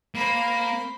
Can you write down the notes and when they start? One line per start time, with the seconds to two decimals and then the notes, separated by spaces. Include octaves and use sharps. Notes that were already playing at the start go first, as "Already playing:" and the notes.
0.15 A#3 C5 B5